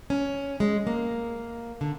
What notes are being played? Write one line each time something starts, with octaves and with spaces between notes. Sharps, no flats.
C#4
G#3
A#3
D3